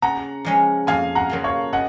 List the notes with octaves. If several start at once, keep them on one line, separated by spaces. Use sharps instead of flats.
C#3 F#5 A#5
F3 G#3 C#4
F2 F5 G#5
F#5 A#5
C#3 F#3 A#3 F4
C#5 F5
C#3 D#5 F#5